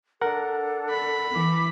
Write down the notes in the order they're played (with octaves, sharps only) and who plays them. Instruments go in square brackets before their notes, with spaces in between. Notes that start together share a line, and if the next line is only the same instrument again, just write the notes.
[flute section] D4 A4 [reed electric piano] A#4 F#5
[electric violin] B5
[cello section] E3 [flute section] D6